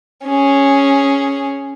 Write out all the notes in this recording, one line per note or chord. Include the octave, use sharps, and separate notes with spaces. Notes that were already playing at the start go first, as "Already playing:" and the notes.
C#4 G#4